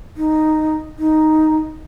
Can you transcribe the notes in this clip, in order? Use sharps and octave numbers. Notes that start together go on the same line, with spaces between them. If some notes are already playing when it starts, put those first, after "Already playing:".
D#4
D#4